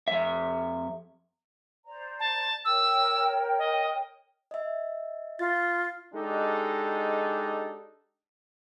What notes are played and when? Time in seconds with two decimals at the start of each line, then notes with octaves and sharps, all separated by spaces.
0.08 F2 E5
1.86 C5 D5 A#5
2.20 A5
2.65 A#4 C#5 G5 E6
3.58 D#5
4.51 D#5 E5
5.39 F4 A6
6.13 G#3 D4 D#4 G4 A4